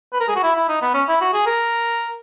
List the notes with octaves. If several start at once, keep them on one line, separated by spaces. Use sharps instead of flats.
B4
A#4
G#4
F#4
E4
E4
D#4
B3
C#4
E4
F#4
G#4
A#4